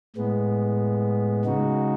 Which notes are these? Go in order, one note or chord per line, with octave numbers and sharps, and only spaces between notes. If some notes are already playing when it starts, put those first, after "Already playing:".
A2 G#3 B3
C#3 G#3 D#4 F#4